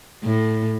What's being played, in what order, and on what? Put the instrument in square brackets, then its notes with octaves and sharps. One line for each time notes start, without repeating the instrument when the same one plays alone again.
[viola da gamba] A2